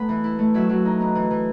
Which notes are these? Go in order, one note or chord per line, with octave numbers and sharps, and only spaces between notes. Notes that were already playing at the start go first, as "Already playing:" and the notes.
Already playing: A3 B3 G#5 B5
E3
E4
A3
F#3 E5
F#3
D#4
B3
E3
E3